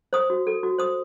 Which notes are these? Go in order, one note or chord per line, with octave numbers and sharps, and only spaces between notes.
C5 D#6
F#4
A4
F#4
C5 D#6